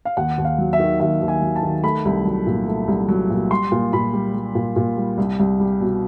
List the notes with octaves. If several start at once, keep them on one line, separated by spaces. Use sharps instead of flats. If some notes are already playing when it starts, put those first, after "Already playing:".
F5
D#2 F#5
D#2
F5
F#3
E5
D#3
D#2 E5
D#2
G#5
F#3
A5
D#3
A3 B5
C2
F#3
A#2
A3
C2
F#3
A#2
G3 C6
A#2
A#2 B5
G3
G3
A#2
A#2
G3
C2
C2
G3
B2